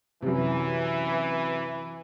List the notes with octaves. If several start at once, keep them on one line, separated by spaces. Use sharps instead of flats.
F#2 C3 E3